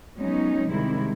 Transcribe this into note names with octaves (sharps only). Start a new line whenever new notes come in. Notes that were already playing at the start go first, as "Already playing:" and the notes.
F#3 G#3 B3 C#4 D#4
C3 D#3 G3 G#3 E4